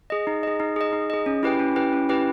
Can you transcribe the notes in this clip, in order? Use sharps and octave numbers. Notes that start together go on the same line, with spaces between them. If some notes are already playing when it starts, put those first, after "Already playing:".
G#4 D#5
D#4
G#4 D#5
D#4
G#4 D#5
D#4
G#4 D#5
C#4
E4 G4 B4 G5
C#4
E4 G4 B4 G5
C#4
E4 G4 B4 G5